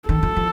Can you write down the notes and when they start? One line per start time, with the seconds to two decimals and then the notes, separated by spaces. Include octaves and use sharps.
0.09 D#3 A4
0.23 F3
0.36 F3